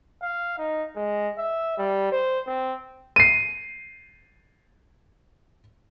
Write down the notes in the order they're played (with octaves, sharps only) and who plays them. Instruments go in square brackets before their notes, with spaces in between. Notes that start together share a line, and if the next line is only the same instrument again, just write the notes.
[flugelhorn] F5
D#4
G#3
E5
G3
C5
C4
[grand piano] C7 D#7